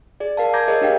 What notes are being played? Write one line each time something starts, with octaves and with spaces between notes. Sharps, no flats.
G#4 D5
A#4 F5 A5
G#5 A#5 D6 G6 G#6 A#6
G#4 A#4 C#5 D#5
D4 G4 F5 G5